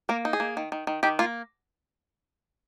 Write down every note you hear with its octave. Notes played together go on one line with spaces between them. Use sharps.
A#3 A#4
D#4
G#4
A#3
D#3
D#3
D#3
D#3 G4
A#3 F4